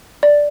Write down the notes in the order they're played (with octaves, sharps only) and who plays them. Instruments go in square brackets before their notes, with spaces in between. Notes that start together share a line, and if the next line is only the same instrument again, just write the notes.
[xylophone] D5